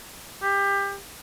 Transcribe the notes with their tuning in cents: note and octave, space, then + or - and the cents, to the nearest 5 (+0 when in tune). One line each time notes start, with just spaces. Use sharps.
G4 +25